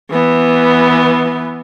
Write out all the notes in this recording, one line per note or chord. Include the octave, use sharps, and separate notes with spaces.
E3 B3